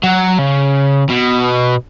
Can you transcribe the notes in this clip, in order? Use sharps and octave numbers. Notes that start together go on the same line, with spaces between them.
F#3
C#3
B2